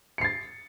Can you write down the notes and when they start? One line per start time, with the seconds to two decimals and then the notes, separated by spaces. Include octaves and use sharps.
0.18 C#7
0.21 C7
0.24 A6